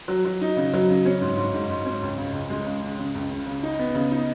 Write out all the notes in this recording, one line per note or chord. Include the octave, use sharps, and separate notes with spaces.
F#3
F#3
D#4
C#3
F#3
C#3
C#4
G#2
G#2
G#2
G#2
C#4
C#2
C#3
C#2
G#3
C#3
C#3
C#3
C#2
C#3
C#3
D#4
B3
C#3
D#4